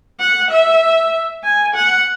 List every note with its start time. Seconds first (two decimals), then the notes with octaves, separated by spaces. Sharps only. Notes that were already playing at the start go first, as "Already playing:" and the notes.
0.20 F#5
0.51 E5
1.44 G#5
1.75 F#5